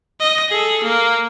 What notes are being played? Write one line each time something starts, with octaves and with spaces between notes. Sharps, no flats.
D#5
G#4 A4
A#3